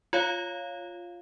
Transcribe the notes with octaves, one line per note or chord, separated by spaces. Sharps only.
F4 C#5 F5